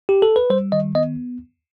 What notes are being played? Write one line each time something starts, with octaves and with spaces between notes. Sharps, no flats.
G4
A4
B4
G3 C5
D#3 D#5
B3 D#5